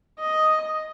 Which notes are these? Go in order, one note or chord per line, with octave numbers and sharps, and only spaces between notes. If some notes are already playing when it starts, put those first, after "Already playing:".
D#5